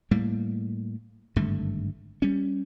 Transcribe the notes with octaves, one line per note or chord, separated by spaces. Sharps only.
A2 G3 A#3
G#1 G2 D3 A3
G3 C#4